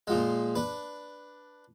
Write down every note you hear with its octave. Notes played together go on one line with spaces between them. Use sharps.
A#2 F3 G#3
D4 B4